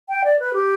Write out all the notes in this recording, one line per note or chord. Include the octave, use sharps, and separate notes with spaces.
G5
D5
B4
G4